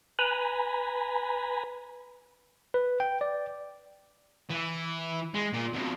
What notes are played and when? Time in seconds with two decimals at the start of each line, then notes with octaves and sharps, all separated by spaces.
0.19 B4 G#5 A#5 B5
2.74 B4
3.00 G5
3.21 D5
4.50 E3
5.35 G#3
5.53 A#2
5.74 F2 B2